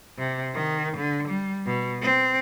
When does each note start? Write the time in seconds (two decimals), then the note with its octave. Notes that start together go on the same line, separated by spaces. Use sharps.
0.18 C3
0.54 D#3
0.97 D3
1.28 G3
1.66 B2
2.02 C4